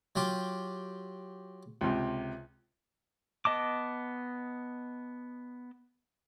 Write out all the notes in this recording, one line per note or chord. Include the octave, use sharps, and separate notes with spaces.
F#3 F4 G4
C#2 C3
B3 D#5 A5 D6